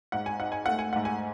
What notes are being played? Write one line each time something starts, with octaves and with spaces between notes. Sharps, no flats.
G#2 F#5
G#5
D#4 F#5
G#5
A3 F#5
G#5
G#2 F#5
G#5